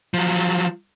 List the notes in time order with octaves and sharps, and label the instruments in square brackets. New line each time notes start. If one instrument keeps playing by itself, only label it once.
[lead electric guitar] F3 F#3